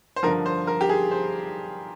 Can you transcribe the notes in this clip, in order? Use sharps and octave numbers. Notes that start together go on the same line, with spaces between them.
C5
G2 D3 F3 A#4
C5
A#4
G4
G#4
C5